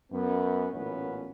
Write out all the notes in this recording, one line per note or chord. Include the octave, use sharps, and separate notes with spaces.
F#2 B3
A1 A#2 B3 C#4